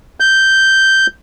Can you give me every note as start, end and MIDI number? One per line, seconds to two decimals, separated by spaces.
0.20 1.07 91